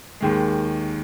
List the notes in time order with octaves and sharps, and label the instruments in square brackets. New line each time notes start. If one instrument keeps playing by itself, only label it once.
[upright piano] D#2 D#3 G#3